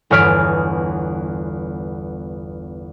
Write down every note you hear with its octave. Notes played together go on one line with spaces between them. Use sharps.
G1 E2 C#5 F6 B6 D7